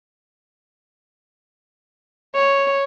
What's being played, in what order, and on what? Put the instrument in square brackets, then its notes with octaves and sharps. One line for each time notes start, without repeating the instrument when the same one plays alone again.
[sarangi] C#5